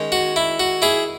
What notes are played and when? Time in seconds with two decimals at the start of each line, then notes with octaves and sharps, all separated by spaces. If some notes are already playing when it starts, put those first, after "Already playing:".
Already playing: D#3 G#3 C#4
0.12 F#4
0.36 E4
0.60 F#4
0.82 E4 G#4